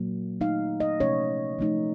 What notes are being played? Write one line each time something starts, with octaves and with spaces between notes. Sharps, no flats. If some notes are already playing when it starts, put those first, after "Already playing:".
Already playing: A#2 F#3 A#3
F#3 A3 D#4 F5
D#5
C3 F3 A3 C#4 C#5
F3 A3 D#4